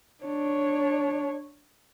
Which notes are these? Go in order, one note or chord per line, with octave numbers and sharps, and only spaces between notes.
D4 C#5